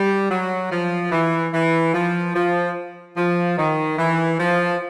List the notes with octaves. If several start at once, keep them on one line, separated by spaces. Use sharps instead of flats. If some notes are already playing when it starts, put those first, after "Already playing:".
Already playing: G3
F#3
F3
E3
E3
F3
F3
F3
D#3
E3
F3